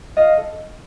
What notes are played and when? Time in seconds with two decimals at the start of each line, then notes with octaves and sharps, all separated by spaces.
0.17 F4 D#5 F5
0.37 A4